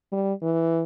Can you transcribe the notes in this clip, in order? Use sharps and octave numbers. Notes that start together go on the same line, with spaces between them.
G3
E3